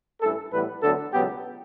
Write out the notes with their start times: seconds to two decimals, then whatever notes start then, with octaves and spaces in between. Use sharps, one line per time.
0.21 A1 G2 E3 A4
0.52 A2 E3 G3 B3 B4
0.82 D2 D3 F#3 B3 A4
1.13 C#2 B2 F#3 B3 G4